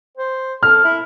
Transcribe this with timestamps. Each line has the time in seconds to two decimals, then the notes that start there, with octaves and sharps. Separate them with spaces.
0.18 C5
0.63 A4 F6
0.84 E4